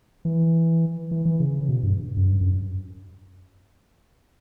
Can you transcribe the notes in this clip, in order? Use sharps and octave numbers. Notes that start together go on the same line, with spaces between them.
E3
E3
E3
C#3
B2
G2
F#2
G2
F#2